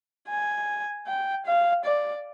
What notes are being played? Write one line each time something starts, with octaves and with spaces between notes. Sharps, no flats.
G#5
G5
F5
D5